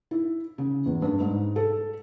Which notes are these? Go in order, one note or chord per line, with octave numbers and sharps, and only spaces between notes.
E4
C#3
E2
G2
G#2
A4